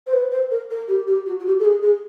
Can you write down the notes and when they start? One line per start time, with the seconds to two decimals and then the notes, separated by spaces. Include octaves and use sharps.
0.07 C5
0.13 B4
0.31 C5
0.51 A#4
0.70 A#4
0.88 G4
1.07 G4
1.26 F#4
1.40 F#4
1.46 G4
1.59 A4
1.65 G#4
1.83 G#4